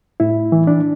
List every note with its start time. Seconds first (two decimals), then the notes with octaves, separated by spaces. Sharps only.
0.20 A2 E4
0.52 E3
0.67 D4